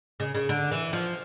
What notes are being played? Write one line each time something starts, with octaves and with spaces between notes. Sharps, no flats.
C#3
C#3
D3
E3
F3